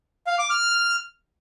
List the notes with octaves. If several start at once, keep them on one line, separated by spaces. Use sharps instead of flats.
F5
D6
F6